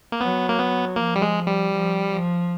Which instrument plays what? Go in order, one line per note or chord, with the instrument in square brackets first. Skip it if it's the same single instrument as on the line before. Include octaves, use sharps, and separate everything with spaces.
[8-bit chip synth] A#3
[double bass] F#3 [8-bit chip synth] B3
[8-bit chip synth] A#3
B3
[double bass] F3 [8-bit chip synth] A#3
[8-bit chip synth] G3
G#3
G3
[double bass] F3
F3